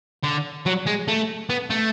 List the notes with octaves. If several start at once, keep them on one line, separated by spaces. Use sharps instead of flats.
D3
F#3
G#3
A3
B3
A3